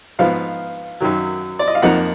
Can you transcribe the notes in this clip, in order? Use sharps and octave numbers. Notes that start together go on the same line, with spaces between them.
G#2 F3 B3 F5
F#2 D#3 F#3
D5
D#5
F5
F2 F3 A#3 D#4 F#5